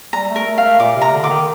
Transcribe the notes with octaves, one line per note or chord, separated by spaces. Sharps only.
G3 A#5
A3
A#4
A3
F5
A3
A#2 D6
C3
A#5
D3
D3 D6
D#3